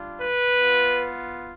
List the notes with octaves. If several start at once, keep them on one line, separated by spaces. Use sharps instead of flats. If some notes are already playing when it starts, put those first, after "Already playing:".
Already playing: G3 D4 F4
B4
B3 F4